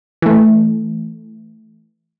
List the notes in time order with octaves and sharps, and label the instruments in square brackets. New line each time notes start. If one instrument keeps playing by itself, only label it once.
[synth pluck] E3 A3